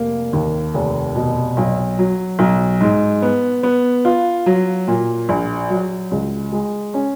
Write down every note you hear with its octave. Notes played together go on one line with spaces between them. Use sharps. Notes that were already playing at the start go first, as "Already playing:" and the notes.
Already playing: F1 A#3
D#2
F1
B2
B1
F#3
B1
G#2
B3
B3
F4
F#3
A#2
A#1
F#3
C#2
G#3
C#4